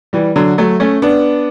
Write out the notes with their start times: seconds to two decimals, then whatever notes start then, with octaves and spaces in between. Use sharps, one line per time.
0.13 E3 G3
0.36 D3 F#3
0.58 F#3 A3
0.80 A3 C#4
1.02 B3 D4